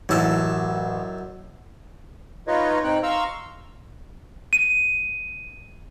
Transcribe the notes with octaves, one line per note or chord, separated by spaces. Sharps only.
A1 F#2 A5 E6
D#4 F4 B4 C#5 D#5
G#2 C4 D#4 G5 F#6
F5 A#5 C6 C#6 E6
D#7